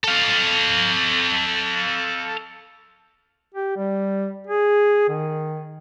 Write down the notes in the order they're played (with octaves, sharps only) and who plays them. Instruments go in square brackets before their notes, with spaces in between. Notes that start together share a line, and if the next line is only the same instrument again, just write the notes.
[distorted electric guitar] A4 F5
[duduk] G4
G3
G#4
D#3